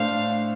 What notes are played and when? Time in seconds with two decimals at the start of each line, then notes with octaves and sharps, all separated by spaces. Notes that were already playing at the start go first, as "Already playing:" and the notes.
Already playing: A2 A3 D4 A4 C5 F5